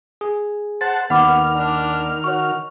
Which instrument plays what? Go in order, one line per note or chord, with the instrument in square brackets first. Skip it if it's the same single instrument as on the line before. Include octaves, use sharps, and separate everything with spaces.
[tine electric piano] G#4
[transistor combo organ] C5 F#5 A5 [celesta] A6
[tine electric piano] D#2 [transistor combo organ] D#3 F6 [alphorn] B3 [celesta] F#5 B5 D6
[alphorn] D4
[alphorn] F#4 [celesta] C#5 C#6